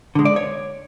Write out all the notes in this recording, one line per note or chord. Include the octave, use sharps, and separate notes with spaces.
D3 G#3
D5
C#5